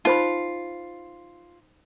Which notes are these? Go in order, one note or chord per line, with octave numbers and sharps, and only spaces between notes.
D#4 F4 C5 B5